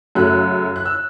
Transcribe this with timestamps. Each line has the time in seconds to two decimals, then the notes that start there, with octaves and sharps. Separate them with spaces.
0.15 F#2 C#3 F#3 A3 F#6
0.76 F#6
0.86 E6